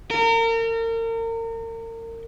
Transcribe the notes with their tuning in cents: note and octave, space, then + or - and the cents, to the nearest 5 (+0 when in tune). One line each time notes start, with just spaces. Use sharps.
A#4 -35